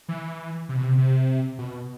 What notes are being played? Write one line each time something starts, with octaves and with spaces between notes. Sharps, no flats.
E3
C3
B2
C3
C3
B2